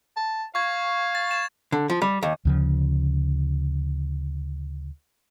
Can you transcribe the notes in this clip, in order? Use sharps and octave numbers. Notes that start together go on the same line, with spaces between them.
A5
F5 C#6 G#6
A6
G#6 A6 E7
D3
F3
G3
D#2
D2 C#3 F3